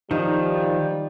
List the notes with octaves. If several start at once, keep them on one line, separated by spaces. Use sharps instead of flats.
D#3 F3 G3 D#4